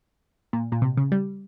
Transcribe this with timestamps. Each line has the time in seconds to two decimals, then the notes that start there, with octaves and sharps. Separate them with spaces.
0.53 A#2
0.72 A#2
0.82 C3
0.97 C#3
1.12 G3